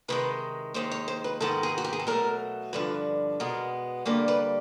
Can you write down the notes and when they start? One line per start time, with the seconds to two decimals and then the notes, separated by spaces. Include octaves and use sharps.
0.08 C3 D#3 G#3 B4
0.74 D#2 D#3 G#3 C5
0.92 C#5
1.08 C5
1.24 B4
1.41 G#2 D#3 G#3 B3 A4
1.63 G#4
1.78 F#4
1.84 G4
1.93 G#4
1.99 A4
2.07 B2 F#3 A3 A#4
2.73 G2 D3 F3 B4
3.40 B2 G#3 B3 A#4
4.05 G2 D3 G3 A#3 B4
4.28 B4